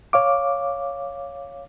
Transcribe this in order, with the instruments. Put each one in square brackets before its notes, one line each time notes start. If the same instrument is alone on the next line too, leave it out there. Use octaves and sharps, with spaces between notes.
[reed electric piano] C#5 F5 D6